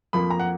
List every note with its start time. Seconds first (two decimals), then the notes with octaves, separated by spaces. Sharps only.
0.13 F2 F3 A#3 B5
0.30 A#5
0.40 F#5